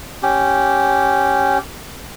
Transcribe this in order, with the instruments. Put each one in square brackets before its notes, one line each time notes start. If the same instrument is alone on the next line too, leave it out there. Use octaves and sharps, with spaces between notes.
[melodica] C#4 G4